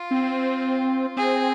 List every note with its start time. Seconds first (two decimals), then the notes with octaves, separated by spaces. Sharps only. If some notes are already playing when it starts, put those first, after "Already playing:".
Already playing: F4
0.11 C4
1.17 C4 G#4